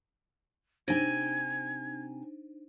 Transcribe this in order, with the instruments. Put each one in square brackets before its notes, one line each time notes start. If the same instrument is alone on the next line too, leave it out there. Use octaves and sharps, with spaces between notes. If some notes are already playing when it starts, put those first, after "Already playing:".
[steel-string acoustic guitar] C3 G#5 [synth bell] D4 D#4 C5 [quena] G#6